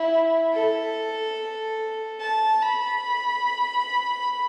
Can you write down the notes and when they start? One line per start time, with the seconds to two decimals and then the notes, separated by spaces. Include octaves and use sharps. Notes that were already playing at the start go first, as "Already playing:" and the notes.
Already playing: E4
0.52 A4
2.20 A5
2.62 B5